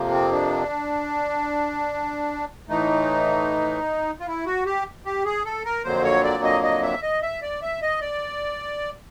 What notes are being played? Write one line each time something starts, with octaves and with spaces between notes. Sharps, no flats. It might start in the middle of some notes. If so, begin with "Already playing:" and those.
Already playing: F2 C3 F3 A#3
C4
D4
A2 E3 A3 D#4
F4
E4
F#4
G4
G4
G#4
A4
A#4
F2 D3 F#3 A#3 C5
C#5
D5
D#5
D#5
E5
D#5
E5
D5
E5
D#5
D5